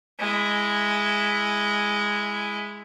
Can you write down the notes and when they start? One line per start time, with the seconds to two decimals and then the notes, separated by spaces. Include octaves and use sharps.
0.20 G#3 E4